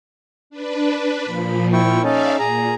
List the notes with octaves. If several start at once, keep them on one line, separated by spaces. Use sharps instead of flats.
D4 B4
A#2 F3 B5
E4 G5 C#6
C#4 D#4 A4 D5 E5 F5
A#2 G#4 A#5